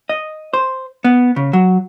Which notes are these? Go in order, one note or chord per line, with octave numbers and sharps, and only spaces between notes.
D#5
C5
B3
C#3
F#3